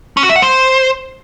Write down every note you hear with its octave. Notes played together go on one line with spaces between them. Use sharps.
C#4
F#4
E5
F#5
C5